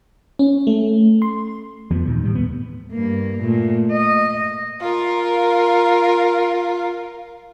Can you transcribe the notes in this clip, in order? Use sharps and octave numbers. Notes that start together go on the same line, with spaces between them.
C#4
A3
C6
F2 E3 F3 B3
D#2 A#2 D#3
A2 G3
B3
G2 A#3
A#2 A3
D#5
F4 A#4